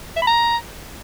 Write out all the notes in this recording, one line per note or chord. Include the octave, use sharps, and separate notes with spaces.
E5
B5
A#5